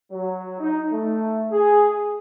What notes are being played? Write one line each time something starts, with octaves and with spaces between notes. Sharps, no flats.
F#3
D#4
A3
G#4